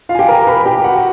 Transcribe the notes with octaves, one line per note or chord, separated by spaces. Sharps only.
F4 F5
G#5
G4 G5
A#4 A#5
B4 B5
G4 G5
F#4 F#5